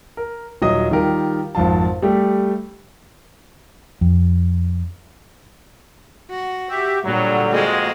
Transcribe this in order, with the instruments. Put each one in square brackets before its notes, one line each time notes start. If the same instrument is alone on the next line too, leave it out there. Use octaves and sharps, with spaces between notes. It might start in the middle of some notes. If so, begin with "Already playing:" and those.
[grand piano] A#4
D#1 F#3 D#5 D#6
D#3 G3 F4 G4 A#4
G#1 F2 F4 A5
G3 A3 G4
[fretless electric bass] F2
[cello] F#4
[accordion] G4 E5
[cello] A#2 [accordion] D3 G3 [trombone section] F#3
[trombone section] F2 G#3 [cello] A#3 F#4